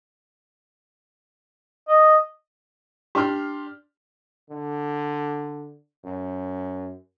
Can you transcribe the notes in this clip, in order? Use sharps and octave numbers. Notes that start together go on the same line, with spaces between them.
D#5
D4 G4 C6 F6
D3
F#2